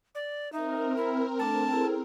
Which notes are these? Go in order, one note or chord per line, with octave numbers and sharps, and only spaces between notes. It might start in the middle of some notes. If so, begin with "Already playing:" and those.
D5
C4 D#4 A#4 E5
E4
A3 D4 A4 A5
E4 G#4 A4